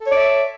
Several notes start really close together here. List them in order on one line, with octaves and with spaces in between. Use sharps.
A4 C#5 D5 E5